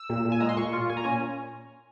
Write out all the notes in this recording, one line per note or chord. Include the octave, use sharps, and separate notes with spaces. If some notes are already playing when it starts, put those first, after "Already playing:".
Already playing: E6
A#2
A#2
G#5
G#3 A#5
C6
A#2 C#6
F4
A#2 G#5
A#5
C#4 G#5